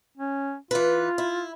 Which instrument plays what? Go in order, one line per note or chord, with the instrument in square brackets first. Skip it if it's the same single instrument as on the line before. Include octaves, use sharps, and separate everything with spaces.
[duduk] C#4
[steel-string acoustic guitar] E3 B4 [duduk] F4
[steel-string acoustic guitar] E4